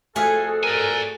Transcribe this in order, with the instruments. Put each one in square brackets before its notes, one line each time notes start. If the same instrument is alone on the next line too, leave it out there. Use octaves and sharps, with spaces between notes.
[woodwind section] F2 F#4 A4 [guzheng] A3 G#4 F5 [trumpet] G#5
[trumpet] A#4 [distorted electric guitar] D5 G#5